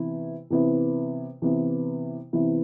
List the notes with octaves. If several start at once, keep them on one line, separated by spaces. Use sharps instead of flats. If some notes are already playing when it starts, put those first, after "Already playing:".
Already playing: C3 E3 B3 E4
C3 E3 B3 E4
C3 E3 B3 E4
C3 E3 B3 E4